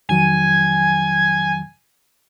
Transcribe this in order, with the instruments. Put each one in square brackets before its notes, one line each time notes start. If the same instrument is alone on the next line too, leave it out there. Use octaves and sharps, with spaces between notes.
[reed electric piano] F2 D#3 F#3 [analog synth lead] G#5